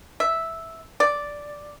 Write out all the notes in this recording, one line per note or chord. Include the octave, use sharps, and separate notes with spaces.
E5
D5